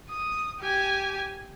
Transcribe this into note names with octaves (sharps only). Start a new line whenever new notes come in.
D#6
G4 G#5